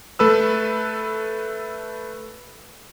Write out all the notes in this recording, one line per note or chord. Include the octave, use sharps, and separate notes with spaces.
A3 A4 B4 E6